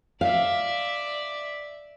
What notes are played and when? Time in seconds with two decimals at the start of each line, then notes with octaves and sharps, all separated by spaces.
0.21 D5 E5 F5